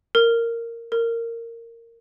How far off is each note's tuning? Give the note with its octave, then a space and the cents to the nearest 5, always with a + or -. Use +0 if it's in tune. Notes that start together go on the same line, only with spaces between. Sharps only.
A#4 -10
A#4 -15